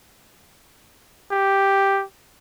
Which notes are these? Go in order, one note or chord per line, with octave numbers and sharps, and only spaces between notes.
G4